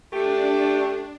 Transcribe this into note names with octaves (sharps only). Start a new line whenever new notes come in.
A3 D4 G4